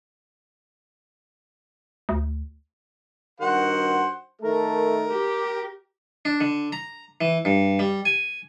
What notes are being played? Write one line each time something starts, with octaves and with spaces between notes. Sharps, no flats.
D2
G2 D#3 F#4 C5 F#5
D#3 A3 A#4
G4
D4
D3
A#5
E3
G2
G3
G#5